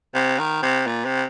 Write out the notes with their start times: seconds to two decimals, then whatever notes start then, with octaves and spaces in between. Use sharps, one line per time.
0.15 C3
0.39 D#3
0.63 C3
0.87 A#2
1.05 C3